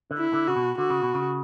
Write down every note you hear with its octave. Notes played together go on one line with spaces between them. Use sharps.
D3
E4
D3
C#3 F#4
B2
D3 F#4
C#3
B2
C#3